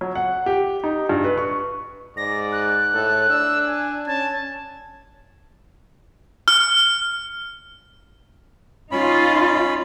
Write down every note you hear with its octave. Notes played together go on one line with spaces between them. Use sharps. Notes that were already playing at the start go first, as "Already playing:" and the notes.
F#3
F#5
G4
D#4
G2
B4
C#6
G#2 D5 A#6
F#6
A2 A4
D4 E6
G#5
C#4 A5 G#6
F6
C#4 D#4 F4 B5